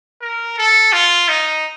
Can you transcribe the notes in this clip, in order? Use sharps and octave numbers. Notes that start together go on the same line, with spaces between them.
A#4
A4
F4
D#4